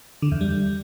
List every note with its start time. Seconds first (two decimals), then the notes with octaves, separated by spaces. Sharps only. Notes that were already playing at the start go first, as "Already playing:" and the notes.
0.22 D3
0.32 E2
0.41 G3